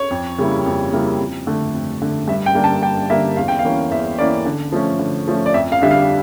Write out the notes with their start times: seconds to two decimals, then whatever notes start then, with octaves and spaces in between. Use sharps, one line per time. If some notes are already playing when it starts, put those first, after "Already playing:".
Already playing: C#5
0.11 F2
0.38 C#3 G3 A#3 E4
0.66 F2
0.93 C#3 G3 A#3 E4
1.19 F2
1.47 D3 A3
1.74 F2
2.02 D3 A3
2.28 G2 E5
2.46 G5
2.55 D3 G3 A#3 D4
2.64 A5
2.82 G2 G5
3.09 D3 G3 A#3 D4 E5
3.37 E2 F5
3.48 G5
3.59 F5
3.64 E3 A#3 C#4
3.91 E2 E5
4.18 E3 A#3 C#4 D5
4.46 D3
4.72 F3 A3 C#4
4.99 D3
5.28 F3 A3 C#4
5.46 D5
5.54 F2 E5
5.72 F5
5.81 D3 G3 D4 E5
5.91 F5